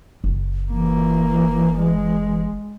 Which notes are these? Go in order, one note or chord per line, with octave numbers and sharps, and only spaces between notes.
F#1
E3 A#3
G#3